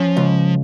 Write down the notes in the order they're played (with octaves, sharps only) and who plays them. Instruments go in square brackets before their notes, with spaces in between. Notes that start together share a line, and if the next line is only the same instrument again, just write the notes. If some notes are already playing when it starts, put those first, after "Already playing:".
Already playing: [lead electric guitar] F3 [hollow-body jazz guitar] C#4
[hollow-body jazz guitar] C#2